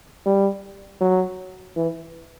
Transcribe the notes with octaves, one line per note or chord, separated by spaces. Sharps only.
G3
F#3
E3